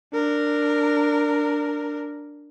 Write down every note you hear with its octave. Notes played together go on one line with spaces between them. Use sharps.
D4 A#4